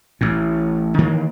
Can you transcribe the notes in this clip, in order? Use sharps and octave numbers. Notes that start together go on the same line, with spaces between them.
A1 A2
D#3 E3 A#3